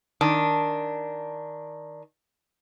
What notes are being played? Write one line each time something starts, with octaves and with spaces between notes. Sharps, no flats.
D#3 D4